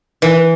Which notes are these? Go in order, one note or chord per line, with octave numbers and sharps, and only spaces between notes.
E3